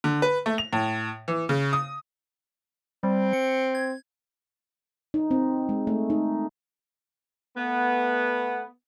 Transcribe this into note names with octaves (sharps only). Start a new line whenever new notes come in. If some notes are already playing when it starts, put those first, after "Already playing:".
D3
B4
A3
F7
A2
E3
C#3
D#6
G3 C4
C#7
G#6
D#4
C4
G#3
A3
D#4
A3 B3